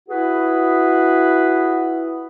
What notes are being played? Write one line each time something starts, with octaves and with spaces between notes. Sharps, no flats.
E4 F#4 G#4 B4